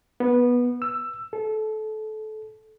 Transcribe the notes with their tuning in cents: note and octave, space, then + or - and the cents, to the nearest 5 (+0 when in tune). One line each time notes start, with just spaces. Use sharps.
B3 -15
E6 +15
A4 -25